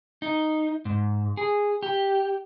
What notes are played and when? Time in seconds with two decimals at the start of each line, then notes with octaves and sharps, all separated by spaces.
0.22 D#4
0.85 G#2
1.37 G#4
1.83 G4